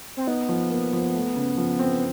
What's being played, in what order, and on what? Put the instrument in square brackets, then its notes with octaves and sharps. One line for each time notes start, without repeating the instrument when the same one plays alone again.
[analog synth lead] C4
[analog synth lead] B3 [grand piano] D#4
[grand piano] F3
A#3
F3
A3
C#3
F3
C4